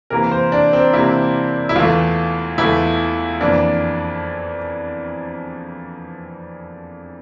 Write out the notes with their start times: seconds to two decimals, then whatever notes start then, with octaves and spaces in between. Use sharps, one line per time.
0.10 C3 E3 A#3 A#4
0.31 C5
0.52 D4
0.73 C4
0.93 C3 E3 A#3 E4
1.69 E4
1.76 E2 E3 A3 F4
2.58 E2 E3 A3 E4
3.41 F2 E3 A#3 D4